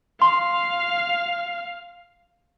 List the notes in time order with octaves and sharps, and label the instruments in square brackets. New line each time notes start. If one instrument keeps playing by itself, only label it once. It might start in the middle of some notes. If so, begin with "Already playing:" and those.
[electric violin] F5 [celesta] C6